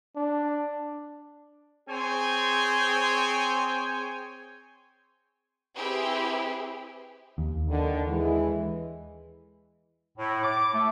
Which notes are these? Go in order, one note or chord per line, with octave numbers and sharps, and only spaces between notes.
D4
C4 G#4 C5 C#5 G5 G#5
C4 E4 G4 G#4 B4
D#2
F#2 D3 D#3
E3 G#3
A2
D6
A3